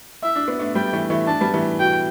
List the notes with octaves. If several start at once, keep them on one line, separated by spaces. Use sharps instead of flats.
E4 E5
D4
B3
A3 D4
G3 B3 G5
E3 A3
E3 A3
A3 D4 A5
G3 B3
E3 A3
B2 G5